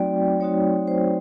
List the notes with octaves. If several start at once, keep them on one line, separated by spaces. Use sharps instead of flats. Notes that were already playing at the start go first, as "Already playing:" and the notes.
Already playing: F#3 A3 C4 D#4 F#4 D5 G5
F#3 A3 C4 D#4 F#4 C#5
C5